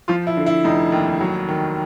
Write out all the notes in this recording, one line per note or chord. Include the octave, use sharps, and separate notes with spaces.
F3 F4
E4
D3
E4
F1 D#4
D#2
F#3
D#3